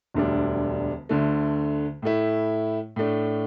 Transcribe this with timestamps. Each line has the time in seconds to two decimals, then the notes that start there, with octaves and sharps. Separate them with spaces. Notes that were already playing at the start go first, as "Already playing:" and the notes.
0.14 E1 D2 D3 G3 D4
1.09 D2 D3 A3
2.02 A2 A3 E4
2.96 A2 A3 D4